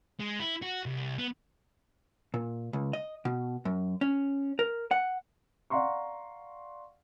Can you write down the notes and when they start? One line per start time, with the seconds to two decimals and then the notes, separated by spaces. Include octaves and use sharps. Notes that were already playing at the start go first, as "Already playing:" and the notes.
0.20 G#3
0.40 E4
0.62 F#4
0.86 C2
1.18 B3
2.34 A#2
2.73 C#2
2.93 D#5
3.25 B2
3.65 F#2
4.01 C#4
4.59 A#4
4.91 F#5
5.70 D5 F5 F#5 A#5 C6 C#6